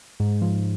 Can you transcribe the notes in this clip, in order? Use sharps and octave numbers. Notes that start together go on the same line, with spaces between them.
G#2
F3